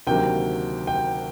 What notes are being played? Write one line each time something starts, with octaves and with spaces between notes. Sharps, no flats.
D2 C3 D#3 F#3 A#3 G5
G5